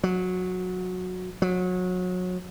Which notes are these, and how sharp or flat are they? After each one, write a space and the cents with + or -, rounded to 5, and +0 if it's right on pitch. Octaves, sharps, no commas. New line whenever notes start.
F#3 -15
F#3 -25